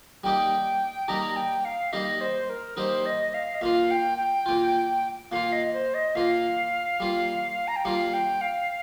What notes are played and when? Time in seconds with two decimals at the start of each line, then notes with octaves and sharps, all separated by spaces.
0.24 G3 A#3 D#4 G4 G5
1.08 G3 A#3 D#4 G4 A#5
1.36 G5
1.65 F5
1.92 G3 A#3 D#4 G4 D#5
2.21 C5
2.49 A#4
2.77 G3 A#3 D#4 G4 C5
3.05 D#5
3.34 F5
3.54 D#5
3.61 A#2 A#3 F4 F5
3.91 G5
4.18 G5
4.46 A#2 A#3 F4
5.31 A#2 A#3 F4 F5
5.52 D#5
5.73 C5
5.94 D#5
6.15 A#2 A#3 F4 F5
7.00 G3 A#3 F4
7.68 A#5
7.76 G5
7.85 G3 A#3 F4 F5
8.13 G5
8.41 F5